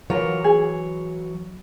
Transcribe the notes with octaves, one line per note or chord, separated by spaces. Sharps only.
E3 F#3 F4 A#4 C#5
G#4